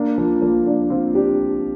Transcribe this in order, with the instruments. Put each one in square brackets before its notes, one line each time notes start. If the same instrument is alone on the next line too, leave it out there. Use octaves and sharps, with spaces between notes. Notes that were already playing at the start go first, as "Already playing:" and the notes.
Already playing: [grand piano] A#3 D4
F3
F3 A#3
A#3 D4
C4 F4
D4 G4